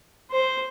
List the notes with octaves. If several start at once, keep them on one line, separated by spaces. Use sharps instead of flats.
C5